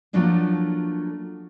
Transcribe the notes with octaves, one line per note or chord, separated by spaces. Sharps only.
F3 F#3 A3 A#3 D4 E4